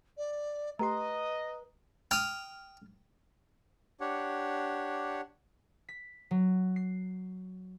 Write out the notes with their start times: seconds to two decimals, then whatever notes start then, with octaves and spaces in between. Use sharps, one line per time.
0.18 D5
0.79 A3 G4 B4 D#5 A#5 C6
2.11 G5 D#6 F6
4.00 D4 G4 C#5 F#5
5.89 B6
6.31 F#3
6.76 C7